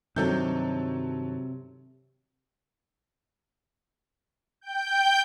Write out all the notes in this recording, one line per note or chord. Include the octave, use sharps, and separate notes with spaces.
G2 C3 D#3 F#3 A4 G6
G5 G6